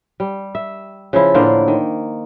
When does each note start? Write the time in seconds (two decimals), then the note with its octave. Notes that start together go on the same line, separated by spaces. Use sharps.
0.20 G3
0.55 E5
1.13 C#3 F3 E4
1.34 A2 D3 A#3 C5
1.68 D#3